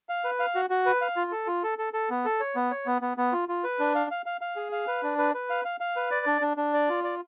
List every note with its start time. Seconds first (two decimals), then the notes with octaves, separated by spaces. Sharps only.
0.09 F5
0.24 B4
0.40 F5
0.55 F#4
0.70 F#4
0.86 B4
1.01 F5
1.16 F4
1.32 A4
1.47 F4
1.63 A4
1.78 A4
1.93 A4
2.10 B3
2.25 A4
2.40 C#5
2.56 B3
2.71 C#5
2.86 B3
3.02 B3
3.17 B3
3.32 F4
3.49 F4
3.64 B4
3.79 D4
3.95 F5
4.11 F5
4.26 F5
4.41 F5
4.56 G#4
4.72 F5
4.87 B4
5.03 D4
5.18 B4
5.34 B4
5.50 F5
5.65 F5
5.80 F5
5.96 B4
6.11 D5
6.26 D4
6.41 D4
6.57 D4
6.74 D5
6.89 F4
7.04 D5